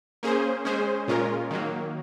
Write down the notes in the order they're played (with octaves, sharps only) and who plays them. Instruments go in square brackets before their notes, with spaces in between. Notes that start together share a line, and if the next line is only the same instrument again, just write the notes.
[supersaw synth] A#3 C#4 G#4 C5
G#3 C#4 G#4 C5
A#2 G#3 C#4 F4 A#4
D#3 F#3 A#3